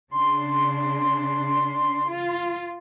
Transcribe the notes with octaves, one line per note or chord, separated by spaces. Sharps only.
C#3 D4 C6
F4